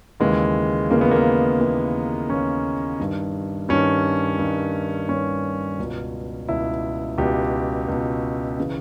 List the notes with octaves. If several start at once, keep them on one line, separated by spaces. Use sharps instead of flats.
D#2 C#3 E3 G#3
D#2 C#3 E3 A#3
B3
A#3
D#2 C#3 E3
D#2 C#3 E3 C#4
G2 D#3
G2 D#3 C#4
G2 D#3
G2 D#3 C#4
C#2 B2
C#2 B2 E4
C#2 B2 G4
C#2 B2
C#3 E3